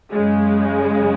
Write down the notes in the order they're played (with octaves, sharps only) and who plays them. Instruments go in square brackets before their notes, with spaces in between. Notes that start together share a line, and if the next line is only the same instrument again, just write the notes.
[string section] F#2 C#3 G#3